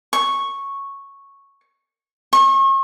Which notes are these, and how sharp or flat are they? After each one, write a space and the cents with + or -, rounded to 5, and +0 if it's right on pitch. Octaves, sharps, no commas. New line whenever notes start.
C#6 -5
C#6 -40